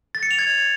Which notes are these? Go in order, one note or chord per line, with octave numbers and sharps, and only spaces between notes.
A6
C#7
F7
G#6